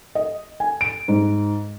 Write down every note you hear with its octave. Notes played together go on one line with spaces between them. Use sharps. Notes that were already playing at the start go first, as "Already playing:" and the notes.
D#5
G#5
D7
G#2